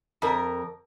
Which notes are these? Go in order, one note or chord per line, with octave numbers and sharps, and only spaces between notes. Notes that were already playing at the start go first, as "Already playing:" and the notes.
F2 A#4